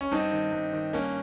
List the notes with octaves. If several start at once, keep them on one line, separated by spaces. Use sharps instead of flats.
C#4
G2 C4 D#4
D#3
G2
D#3
G2 A#3 C#4